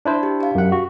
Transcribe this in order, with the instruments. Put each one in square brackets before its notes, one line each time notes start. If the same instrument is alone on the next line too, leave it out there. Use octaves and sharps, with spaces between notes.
[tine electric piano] D4 E4 C5
[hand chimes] G4
G4 F5
[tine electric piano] F#2 F#5
F#4